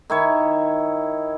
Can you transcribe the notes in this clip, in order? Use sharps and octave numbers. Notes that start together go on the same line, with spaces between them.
D#3 E4 C#5